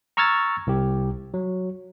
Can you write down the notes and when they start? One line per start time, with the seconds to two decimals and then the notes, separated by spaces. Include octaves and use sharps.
0.17 A#5 C#6 E6 F6 G#6 A6
0.67 C2 G4
1.34 F#3